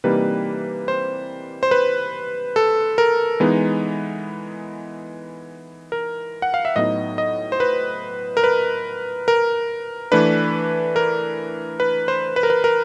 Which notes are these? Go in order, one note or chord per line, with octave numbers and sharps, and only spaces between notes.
C3 E3 G3 A#3 D#4 B4
C5
C5
B4
A4
A#4
E3 G#3 B3 D#4
A#4
F#5
F5
E5
A2 F#3 B3 D#4 D#5
D#5
C5
B4
A#4
B4
A#4
E3 A3 D4 B4
A#4
B4
C5
B4
A#4
B4
A#4